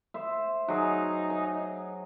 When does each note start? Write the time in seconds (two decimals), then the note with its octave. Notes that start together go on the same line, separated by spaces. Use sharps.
0.14 C5 E5
0.68 F#3 D#4 G#4
1.30 G#5